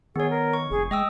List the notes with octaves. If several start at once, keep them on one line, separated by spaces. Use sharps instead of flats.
D#3 B3 G#4 C#5
A#4
C#6
F1 G#4
G#3 D#5 G5 D#6 E6